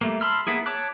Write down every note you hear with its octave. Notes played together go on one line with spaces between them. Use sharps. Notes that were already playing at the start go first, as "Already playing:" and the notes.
G3 A3 A#3
A5 B5 C6 E6 F6
A#3 B3 E4 G#4
C#5 A5 D6 F#6